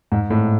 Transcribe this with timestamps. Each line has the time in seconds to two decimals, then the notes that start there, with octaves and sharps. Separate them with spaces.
0.12 G#2
0.30 A2